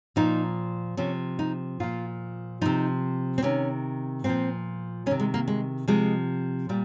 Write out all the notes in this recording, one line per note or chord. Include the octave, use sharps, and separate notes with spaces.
A#2 F3 D#4
C3 F3 C#4
D#4
A#2 F3 F4
C3 F3 D#4
C4
C3 D#3 C#4
A#2 F3 C4
C3 D#3 C#4
G#3
A#3
G#3
C3 F3 G#3
A#2 G3